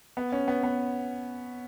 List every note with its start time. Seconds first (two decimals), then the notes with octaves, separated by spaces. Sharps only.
0.17 B3
0.32 C#4
0.48 B3
0.63 B3